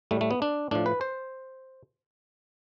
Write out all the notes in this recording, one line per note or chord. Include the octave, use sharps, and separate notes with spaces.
A2 G3 A3
A3
B3
D4
A2 F3 D4
B4
C5